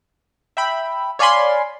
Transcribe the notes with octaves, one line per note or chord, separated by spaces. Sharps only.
E5 G5 B5
C#5 D5 F5 G#5 B5 C6